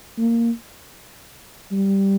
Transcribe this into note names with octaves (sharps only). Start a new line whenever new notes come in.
A#3
G3